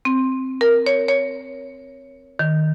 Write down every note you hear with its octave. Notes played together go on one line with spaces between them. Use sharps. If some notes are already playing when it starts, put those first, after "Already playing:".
C4
A#4
C#5
C#5
D#3